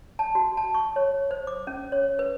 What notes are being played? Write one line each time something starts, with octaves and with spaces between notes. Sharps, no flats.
A5
F#4
A5
C#6
C#5
C5
D6
C#4
C#5
B4